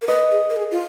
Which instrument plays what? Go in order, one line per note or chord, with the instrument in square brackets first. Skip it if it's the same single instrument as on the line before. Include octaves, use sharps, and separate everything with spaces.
[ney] A#4
[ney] B4 [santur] D#5
[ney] G#4
A#4
G#4
F4